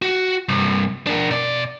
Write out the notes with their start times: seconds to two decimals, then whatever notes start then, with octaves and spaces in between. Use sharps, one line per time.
0.02 F#4
0.49 C2 G2
1.07 D4 A#4
1.31 B2 D5